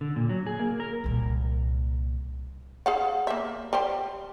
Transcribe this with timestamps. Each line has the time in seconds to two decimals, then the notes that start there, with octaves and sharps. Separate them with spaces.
0.01 D3
0.16 A#2
0.29 F#3
0.47 G#4
0.59 A#3
0.80 A#4
1.04 C2 A#2
2.86 G#4 F5 F#5
3.27 A#3 E5
3.73 G3 G4 C5